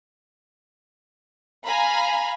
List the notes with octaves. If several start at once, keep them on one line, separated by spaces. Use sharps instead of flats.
F5 G#5 A#5 B5